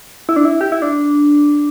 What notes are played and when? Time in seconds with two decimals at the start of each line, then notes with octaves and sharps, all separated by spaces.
0.29 E4
0.36 D4
0.45 E4
0.61 G4
0.72 E4
0.82 D4